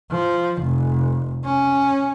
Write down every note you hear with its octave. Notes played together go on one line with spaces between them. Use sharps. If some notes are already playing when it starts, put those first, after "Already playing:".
F3
F1
C#4